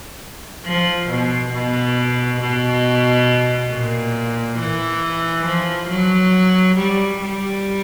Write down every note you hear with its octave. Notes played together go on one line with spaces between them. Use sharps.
F3
B2
B2
B2
A#2
E3
F3
F#3
G3
G3